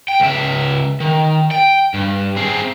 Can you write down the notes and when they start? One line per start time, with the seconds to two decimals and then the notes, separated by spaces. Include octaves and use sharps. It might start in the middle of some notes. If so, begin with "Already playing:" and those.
0.08 G5
0.20 C#2 E5
1.00 D#3
1.51 G5
1.94 G2
2.36 C4 G#4